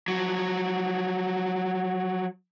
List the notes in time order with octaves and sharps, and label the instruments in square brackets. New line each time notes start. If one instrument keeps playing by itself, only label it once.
[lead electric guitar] F3 F#3